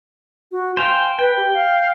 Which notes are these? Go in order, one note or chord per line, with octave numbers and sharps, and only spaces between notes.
F#4
C5 F5 G5 G#5
B4 G5
G4
F5